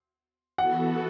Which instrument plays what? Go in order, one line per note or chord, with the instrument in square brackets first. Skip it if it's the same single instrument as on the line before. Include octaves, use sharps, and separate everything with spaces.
[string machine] E3 B3 F#4 A4 [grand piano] F#5